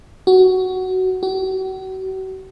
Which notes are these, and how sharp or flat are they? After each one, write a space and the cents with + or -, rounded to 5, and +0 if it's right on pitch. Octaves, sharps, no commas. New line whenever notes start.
F#4 +10
F#4 +40